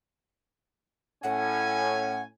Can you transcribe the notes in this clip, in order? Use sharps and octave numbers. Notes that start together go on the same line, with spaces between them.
A2 C#4 F#5 G#5